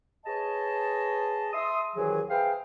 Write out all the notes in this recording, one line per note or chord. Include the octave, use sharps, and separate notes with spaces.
G#4 B4 C#5 D#5 A5
E5 C6 D#6
C2 F#2 D#3 E3 F#3 G#4
G#4 B4 C5 E5 F5 G5